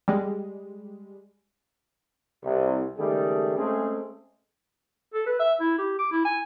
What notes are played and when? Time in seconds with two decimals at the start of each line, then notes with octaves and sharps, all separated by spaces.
0.08 G3 G#3
2.44 C2
2.98 C#2 D#3 G3 A3 G#4
3.57 G#3 A3 C4 C#4 G#4
5.14 A4
5.27 B4
5.40 E5
5.60 E4
5.78 G4
5.99 D6
6.12 E4
6.25 G#5